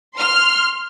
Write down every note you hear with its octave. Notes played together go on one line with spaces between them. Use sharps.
C6 F6